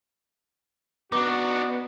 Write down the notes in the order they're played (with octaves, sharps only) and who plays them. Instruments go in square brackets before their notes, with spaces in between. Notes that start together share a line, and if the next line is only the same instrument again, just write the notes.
[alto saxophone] B3 [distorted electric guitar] D4 D#4 [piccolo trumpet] F#4 [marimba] D6